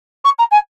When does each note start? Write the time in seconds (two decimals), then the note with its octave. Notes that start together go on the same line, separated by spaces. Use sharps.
0.24 C#6
0.38 A#5
0.51 G#5